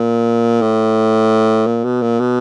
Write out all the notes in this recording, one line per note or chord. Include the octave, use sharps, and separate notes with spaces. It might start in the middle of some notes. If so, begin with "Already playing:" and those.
Already playing: A#2
A2
A#2
B2
A#2
B2